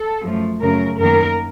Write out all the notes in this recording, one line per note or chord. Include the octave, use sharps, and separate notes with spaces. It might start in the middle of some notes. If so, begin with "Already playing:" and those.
Already playing: A4
F#2 F3 A3
F#2 C#3 A3 A#4
F#2 D#3 A#3 A#4